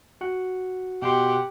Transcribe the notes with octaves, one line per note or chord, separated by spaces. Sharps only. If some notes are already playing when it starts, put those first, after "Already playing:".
F#4 F#5
B2 G4 F#5 C6